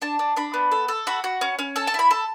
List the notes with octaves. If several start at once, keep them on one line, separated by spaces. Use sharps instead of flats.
D4 A5
D4
D4 B5
B3
A4
A4
F#4 B5
F#4
C#4
C#4
A4 A5
A5
E4 B5
A4 A5